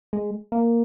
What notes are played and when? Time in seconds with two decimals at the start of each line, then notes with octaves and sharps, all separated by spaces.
0.13 G#3
0.52 A#3